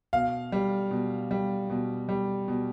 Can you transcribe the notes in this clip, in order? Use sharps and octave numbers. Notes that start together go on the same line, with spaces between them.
B2 F5
G3
B2
G3
B2
G3
B2